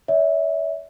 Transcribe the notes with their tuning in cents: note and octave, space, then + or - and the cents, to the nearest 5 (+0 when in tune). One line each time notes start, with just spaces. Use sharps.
C#5 +45 E5 -25